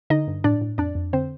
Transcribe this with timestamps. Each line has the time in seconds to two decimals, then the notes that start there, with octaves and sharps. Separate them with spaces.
0.10 D3 D#4 D#5
0.27 G2
0.44 A2 D4 D5
0.61 A2
0.78 F2 D4 D5
0.95 F2
1.13 D3 C4 C5